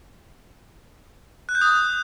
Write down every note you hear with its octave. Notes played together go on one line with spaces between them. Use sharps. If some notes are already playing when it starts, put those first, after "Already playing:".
F#6
G6
D#6